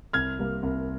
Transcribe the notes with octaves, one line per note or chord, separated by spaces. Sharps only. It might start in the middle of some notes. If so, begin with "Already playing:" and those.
C2 F6 G#6
C3 G3 A#3
C2